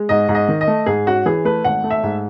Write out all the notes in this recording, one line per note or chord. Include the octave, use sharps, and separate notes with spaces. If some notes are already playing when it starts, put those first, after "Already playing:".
Already playing: G#3
G#2 D#5
G#2
D#5
D#3
D#5
A3
G#2 G#4
C#4 F#4
E3 G#4
A3 B4
G#1 F#5
A3
E5
G#2